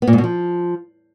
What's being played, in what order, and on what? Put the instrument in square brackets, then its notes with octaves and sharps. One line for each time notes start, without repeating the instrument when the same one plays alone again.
[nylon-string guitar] B3
A#2
G#2
B2
F3